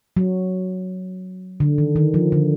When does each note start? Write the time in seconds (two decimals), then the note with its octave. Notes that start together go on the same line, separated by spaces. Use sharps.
0.17 F#3
1.60 D3
1.78 D#3
1.96 D#3
2.14 F3
2.32 D3